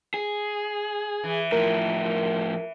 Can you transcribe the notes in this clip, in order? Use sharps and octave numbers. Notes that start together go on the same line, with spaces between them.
G#4
E3
A2 F3 A#4